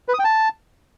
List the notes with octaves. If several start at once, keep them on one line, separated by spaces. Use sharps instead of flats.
B4
D#6
G5
A5